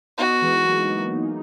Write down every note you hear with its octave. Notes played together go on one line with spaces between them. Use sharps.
B3 D#4 F#4
E3 G#3
F#3 A#3
G#3 B3
F#3 A#3